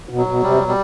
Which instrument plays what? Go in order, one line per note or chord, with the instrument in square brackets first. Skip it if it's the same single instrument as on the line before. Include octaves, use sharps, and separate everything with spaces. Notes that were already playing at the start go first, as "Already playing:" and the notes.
[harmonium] B2
[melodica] F#3
[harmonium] B2
[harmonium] C3 [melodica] G3
[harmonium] B2
[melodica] G3